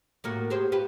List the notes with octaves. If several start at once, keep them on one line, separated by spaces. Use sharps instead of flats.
A2 A#3 F#4
G4 G#4 C5
F4 G4 B4